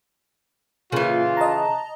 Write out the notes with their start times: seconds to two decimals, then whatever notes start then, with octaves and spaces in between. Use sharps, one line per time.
0.92 A#2 C#3 E3 F4
1.37 D#5 A5 A#5